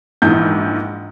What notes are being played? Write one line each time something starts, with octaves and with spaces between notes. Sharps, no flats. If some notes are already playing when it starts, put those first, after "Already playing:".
A#1 G#2 E3 G6